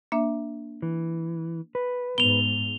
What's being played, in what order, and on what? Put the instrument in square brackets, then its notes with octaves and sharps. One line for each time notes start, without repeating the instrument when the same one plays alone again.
[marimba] A#3 D4 E5
[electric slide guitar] E3
B4
[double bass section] G#2 [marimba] B3 [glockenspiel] F7 G7